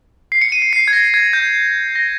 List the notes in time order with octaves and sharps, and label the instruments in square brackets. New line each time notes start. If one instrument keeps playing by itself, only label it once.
[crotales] C7
C#7
D#7
C#7
C7
G#6
A#6
G#6
G6
A#6